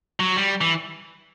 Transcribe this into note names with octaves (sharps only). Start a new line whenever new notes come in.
F#3
G3
E3